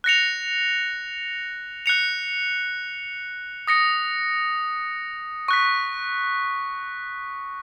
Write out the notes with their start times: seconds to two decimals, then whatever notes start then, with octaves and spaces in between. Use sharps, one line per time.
0.04 F#6 A#6 C#7 F7
1.86 F#6 C#7 F7
3.67 D#6 A#6 C#7
5.48 C#6 F#6 B6